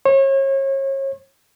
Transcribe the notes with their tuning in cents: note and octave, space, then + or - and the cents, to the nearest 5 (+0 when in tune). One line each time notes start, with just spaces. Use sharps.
C#5 -35